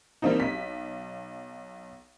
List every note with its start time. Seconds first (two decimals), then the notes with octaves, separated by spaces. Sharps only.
0.22 G3 A#3 C4 D4 D#4
0.40 B1 B6